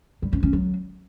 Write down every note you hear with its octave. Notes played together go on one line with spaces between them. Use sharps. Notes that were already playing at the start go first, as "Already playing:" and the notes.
G3
C#4
C#4
F#3